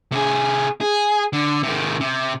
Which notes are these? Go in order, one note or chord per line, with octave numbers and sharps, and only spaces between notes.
C3 G#4
G#4
D3
C3 D#3
C3